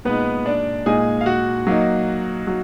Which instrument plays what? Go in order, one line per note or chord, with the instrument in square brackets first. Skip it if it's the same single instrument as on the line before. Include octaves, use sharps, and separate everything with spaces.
[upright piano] A#2 G#3 D#4 [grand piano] B3 B4
[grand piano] D4 D5
[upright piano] A#2 G#3 D#4 [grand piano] G#4 G#5
[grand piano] F5
F#4 F#5
[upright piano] F#3 A#3 D#4
F#3